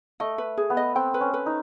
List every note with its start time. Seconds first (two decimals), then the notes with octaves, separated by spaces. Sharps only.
0.20 A3 D#5
0.38 B4
0.57 G#4
0.70 B3
0.77 D#5
0.96 C4 G5
1.14 B4
1.21 C#4
1.34 B4
1.46 D#4